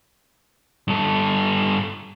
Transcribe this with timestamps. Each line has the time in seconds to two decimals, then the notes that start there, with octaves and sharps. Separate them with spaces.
0.88 G2 A4